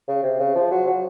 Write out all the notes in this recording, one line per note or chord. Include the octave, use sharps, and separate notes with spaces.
C#3
C3
C#3
F3
F#3
F#3